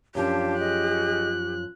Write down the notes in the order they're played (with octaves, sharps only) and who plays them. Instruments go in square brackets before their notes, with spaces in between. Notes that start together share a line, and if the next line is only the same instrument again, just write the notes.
[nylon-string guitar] F#2 F3 [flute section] D4 F5 A5 [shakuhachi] G4
[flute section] G#4 D#5 [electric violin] F#6